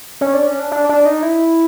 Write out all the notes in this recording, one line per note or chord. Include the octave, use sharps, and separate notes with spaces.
C#4
D4
C#4
D4
D4
D4
D#4
E4